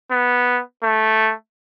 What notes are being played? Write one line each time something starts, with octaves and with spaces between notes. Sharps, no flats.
B3
A3